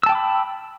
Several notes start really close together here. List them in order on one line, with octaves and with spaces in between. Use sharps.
E6 A5 G5 D6 B5